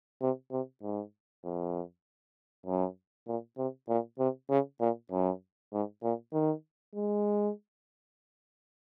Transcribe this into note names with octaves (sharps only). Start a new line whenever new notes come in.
C3
C3
G#2
F2
F#2
A#2
C3
A#2
C3
C#3
A#2
F#2
G#2
A#2
D#3
G#3